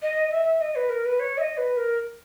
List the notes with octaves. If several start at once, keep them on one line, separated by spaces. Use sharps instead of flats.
D#5
E5
D#5
B4
A#4
B4
C#5
E5
D#5
B4
A#4